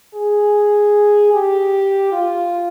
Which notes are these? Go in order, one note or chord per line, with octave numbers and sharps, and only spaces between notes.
G#4
G4
F4